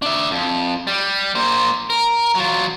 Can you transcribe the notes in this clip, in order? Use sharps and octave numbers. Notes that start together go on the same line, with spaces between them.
D4 E5
F2
G3
A#3 C5
A#4
F#3 F4